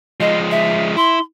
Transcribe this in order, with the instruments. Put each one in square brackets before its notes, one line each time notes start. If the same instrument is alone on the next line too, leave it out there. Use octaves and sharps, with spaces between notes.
[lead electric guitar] F3 G#3 [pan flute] D#5
[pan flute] E5
[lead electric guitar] E4 [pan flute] C6